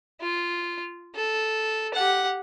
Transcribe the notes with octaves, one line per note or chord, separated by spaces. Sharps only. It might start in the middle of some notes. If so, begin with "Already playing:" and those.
F4
A4
G4 F#5